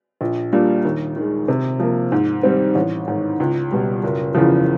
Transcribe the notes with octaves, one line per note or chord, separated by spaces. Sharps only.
A#1
A#2 G3 A#3 D4
D#2
D#3 G#3
C3
F3 A#3
G#2
D#3 G3 C4
A1
G#2 D#3
C#2
B2 G3
F#1
E2 C#3 F3